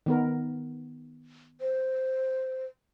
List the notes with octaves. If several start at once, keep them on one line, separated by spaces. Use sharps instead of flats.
D#3 B3 A#4
C5